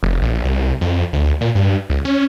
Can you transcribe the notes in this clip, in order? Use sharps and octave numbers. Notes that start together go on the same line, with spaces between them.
F1
A#1
C2
F2
D2
A#2
G2
C#2
C#4